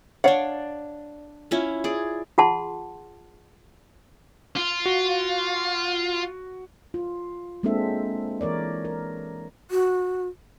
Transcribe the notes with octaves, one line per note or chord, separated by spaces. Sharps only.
D4 C#5 D5 F5 F#5
C#4 E4 F4
G#4 D5
F4 G#4 F#5 A5 C6
F4
F#4
F4
G#3 A#3 C4 D4 A4 E5
E3 A#4 C#5 D5
A#4
F#4